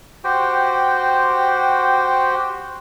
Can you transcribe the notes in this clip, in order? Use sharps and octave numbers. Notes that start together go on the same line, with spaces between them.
F#4 G4 C5 G5